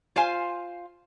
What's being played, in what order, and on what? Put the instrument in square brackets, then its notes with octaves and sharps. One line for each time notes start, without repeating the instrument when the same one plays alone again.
[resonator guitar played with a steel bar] F4 C5 F5 G#5